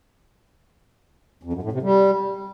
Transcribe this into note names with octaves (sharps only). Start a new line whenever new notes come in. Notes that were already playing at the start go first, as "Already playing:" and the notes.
F2
F#2
A2
C3
G3